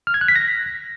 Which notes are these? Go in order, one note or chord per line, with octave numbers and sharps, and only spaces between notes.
F6
G#6
F#6
B6
A#6